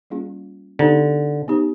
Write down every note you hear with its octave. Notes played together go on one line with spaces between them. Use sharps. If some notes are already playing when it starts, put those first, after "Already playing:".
G3 A#3 C#4 F4 G#4
D3 B3 D#4 G4 C5
B3 D#4 G4 C5